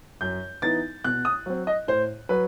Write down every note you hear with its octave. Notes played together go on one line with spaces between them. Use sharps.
F#2 G6
E3 B3 D#4 A6
B2 F#6
D#6
F#3 C4
D#5
A2 C5
F#3 B4